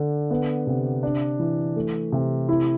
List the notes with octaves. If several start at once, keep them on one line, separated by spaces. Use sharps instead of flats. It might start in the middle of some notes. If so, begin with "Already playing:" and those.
Already playing: D3 D4
B3
C3
D4
E3
A3
C3
E4